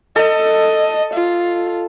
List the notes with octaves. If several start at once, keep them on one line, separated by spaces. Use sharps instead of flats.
A4 D#5
F4